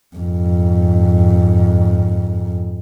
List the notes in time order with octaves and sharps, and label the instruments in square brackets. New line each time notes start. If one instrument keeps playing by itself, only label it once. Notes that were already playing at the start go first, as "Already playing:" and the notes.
[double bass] F2 G#2